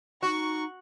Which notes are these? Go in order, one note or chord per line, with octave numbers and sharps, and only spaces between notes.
D#4 F#4 C#6